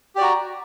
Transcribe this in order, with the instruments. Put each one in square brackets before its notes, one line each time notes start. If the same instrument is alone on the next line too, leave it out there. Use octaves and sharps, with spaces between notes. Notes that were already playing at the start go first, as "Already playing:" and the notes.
[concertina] G4
D5
F#4
A#5